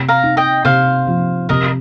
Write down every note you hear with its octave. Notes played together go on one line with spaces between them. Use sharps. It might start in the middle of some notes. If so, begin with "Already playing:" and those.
Already playing: C3
F5 A#5
D#4
D#5 G5
C3 C5 F5
F3
C3 A#4 D#5